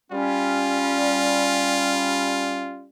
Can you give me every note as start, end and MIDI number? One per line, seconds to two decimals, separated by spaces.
0.11 2.89 55
0.11 2.89 61
0.11 2.85 65